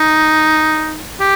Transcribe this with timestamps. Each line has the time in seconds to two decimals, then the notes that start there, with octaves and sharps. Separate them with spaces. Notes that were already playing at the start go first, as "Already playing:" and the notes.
Already playing: D#4
1.21 G4